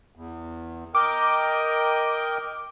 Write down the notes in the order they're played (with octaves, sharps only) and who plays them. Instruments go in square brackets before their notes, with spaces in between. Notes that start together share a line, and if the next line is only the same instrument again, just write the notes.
[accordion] E2
[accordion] A#4 D#5 G5 [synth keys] D6